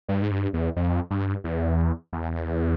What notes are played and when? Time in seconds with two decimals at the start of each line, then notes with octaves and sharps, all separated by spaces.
0.09 G2
0.22 G#2
0.31 G2
0.53 E2
0.76 F2
1.11 G2
1.44 E2
2.13 E2